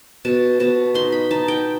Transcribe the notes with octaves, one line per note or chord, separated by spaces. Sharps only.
B2 A5
B2 A5
D#4 C6
B5
D#4 A5
G5